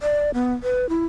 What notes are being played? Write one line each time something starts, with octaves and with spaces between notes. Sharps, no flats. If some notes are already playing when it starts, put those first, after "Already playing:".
D5
B3
B4
E4